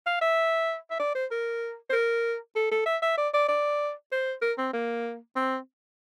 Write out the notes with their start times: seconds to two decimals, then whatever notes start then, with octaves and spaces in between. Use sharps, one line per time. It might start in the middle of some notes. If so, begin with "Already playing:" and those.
0.07 F5
0.22 E5
0.91 E5
1.00 D5
1.15 C5
1.31 A#4
1.90 C5
1.93 A#4
2.56 A4
2.71 A4
2.86 E5
3.02 E5
3.18 D5
3.34 D5
3.49 D5
4.12 C5
4.42 A#4
4.58 C4
4.73 A#3
5.36 C4